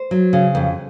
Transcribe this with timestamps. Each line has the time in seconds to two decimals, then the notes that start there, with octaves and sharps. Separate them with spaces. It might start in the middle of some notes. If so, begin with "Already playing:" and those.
Already playing: C5
0.11 F#3
0.33 C#3
0.55 F2